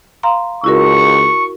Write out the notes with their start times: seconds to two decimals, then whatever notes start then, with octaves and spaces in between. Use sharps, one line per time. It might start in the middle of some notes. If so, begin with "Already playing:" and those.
0.23 F5 A#5 C6
0.64 C#2 E4 F#4 A#4 C#6